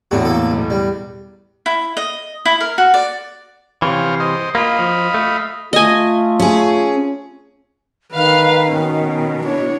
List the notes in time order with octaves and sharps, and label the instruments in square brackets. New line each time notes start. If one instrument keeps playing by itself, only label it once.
[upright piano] E2 A2 [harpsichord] D3 F#4
[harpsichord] A#3 A4
B1
G3
[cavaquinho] E4
D#5
E4
A#4
F#4
D5
[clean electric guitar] C3 E3 [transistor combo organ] C5 C#5 F5
[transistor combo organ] C5 D#5
[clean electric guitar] A#3 F4 [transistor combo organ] D#5 F5 B5
[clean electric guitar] F3
A3
[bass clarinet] A3 [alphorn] F4 [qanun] D#5 G#5
[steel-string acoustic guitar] C#4 G#4
[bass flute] D#3 [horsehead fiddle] B4 [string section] F5
[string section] B2 [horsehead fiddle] C#4
[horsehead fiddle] D4 C#5 [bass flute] E4